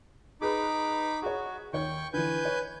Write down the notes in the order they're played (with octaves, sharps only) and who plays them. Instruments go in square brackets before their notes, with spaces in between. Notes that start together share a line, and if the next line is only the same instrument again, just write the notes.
[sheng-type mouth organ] D#4 B5 D6 [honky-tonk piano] G#4 B4
[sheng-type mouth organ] F#4 [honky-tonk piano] G#4 C#5
[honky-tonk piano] D#2 C#5 G6 [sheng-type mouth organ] G5 C#6
[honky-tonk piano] D3 E3 [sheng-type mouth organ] B4 G#5 G6
[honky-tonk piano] C#5